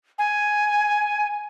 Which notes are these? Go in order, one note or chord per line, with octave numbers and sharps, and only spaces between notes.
G#5